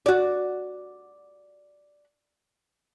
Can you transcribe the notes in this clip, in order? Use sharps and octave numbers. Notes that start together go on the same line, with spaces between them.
F#4 D5